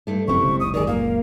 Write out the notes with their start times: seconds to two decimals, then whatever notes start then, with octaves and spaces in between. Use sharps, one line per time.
0.07 G2 A3 D4
0.28 E1 F#2 C3 C4 C#4 E4 C#6
0.44 F#1 C#2 D3
0.60 D#6
0.74 D#3 G#4 D5
0.87 A#2 A#3 F5